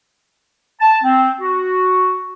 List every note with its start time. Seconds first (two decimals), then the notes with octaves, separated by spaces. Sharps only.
0.80 A5
1.04 C4
1.40 F#4